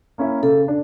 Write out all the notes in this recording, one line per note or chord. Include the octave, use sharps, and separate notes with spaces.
A#3 C#4 E4
C#3 A4
D4